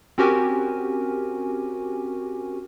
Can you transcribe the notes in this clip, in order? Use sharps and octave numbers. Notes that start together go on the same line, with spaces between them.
C4 C#4 F#4 G4 A#4 G#5